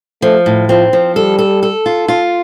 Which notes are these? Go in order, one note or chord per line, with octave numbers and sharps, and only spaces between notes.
F3 A3
A2
F3 C4
F3
G3 A4
A4
A4
F4
F4